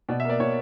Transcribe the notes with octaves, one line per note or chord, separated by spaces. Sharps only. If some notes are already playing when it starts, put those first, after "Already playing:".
B2 D5
E5
A#3 D5
B2 C#5